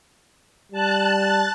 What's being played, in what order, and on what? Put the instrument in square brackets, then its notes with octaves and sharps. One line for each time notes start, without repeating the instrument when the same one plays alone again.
[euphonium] G3 [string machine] A5 F#6